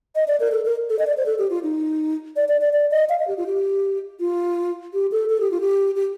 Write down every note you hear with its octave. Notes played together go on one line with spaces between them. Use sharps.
D#5
D5
A#4
A4
A#4
A4
D#5
D5
C5
A4
G4
F4
D#4
D5
D5
D5
D5
D#5
F5
D#5
G4
F4
G4
F4
G4
A4
A4
G4
F4
G4
G4